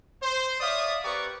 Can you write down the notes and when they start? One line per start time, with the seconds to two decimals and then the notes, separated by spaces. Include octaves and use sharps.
0.23 C5
0.60 C#5 D5 E5 F5 D#6
1.04 C4 G4 A#4 B4 D5 C#6